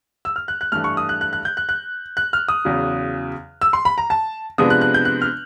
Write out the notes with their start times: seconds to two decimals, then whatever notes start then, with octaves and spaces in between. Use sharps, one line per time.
0.25 E6
0.36 F6
0.48 F#6
0.61 F#6
0.72 G2 E3 A3 F6
0.84 C#6
0.97 D#6
1.09 F#6
1.21 F#6
1.33 F#6
1.45 G6
1.57 F#6
1.69 F#6
2.17 F#6
2.33 F6
2.48 D#6
2.65 E2 C#3 F#3
3.61 E6
3.73 C6
3.85 B5
3.98 A#5
4.10 A5
4.58 C3 F3 G#3 B3 D4 D#6
4.70 F#6
4.81 F#6
4.94 G6
5.05 F#6
5.22 F6